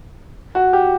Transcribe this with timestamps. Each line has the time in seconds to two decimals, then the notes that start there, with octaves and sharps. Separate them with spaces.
0.55 F#4
0.73 G4